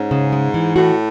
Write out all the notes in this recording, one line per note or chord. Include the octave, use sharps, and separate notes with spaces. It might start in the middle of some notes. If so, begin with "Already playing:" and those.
Already playing: G#2 C#4
C#3
G#3
E3
A2 F#4